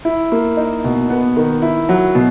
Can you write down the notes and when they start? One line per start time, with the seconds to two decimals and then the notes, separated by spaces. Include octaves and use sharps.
0.05 E4
0.32 A#3
0.57 D#4
0.84 B2
1.10 B3
1.37 D#3
1.62 E4
1.89 F#3
2.15 B2